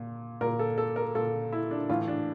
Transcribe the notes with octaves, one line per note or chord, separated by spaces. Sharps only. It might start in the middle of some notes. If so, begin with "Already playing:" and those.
Already playing: A#2
A#2 A#4
A4
A4
A#4
A#2 A4
E4
D4
A2 E3 F4
D4